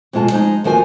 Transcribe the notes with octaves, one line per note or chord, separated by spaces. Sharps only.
F2 B2 G#3 F4 A5
F3 G#3 D#4
D#2 F3 F#4 A#4 G#5